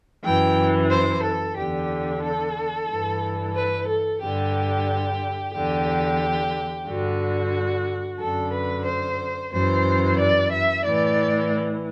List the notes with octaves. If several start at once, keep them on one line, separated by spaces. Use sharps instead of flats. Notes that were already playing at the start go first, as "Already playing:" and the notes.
F#2 E3 G5
C5
A4
E2 D3 G4
A4
G2 E3
B4
A4
G2 D3 G4
E2 D3 G4
G2 D3 F#4
F#2 D3 A4
B4
C5
F#2 E3 C5
D5
E5
A2 E3 D5